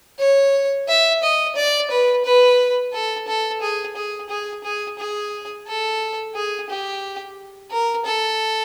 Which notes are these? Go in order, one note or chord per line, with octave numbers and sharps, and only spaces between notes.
C#5
E5
D#5
D5
B4
B4
A4
A4
G#4
G#4
G#4
G#4
G#4
A4
G#4
G4
A#4
A4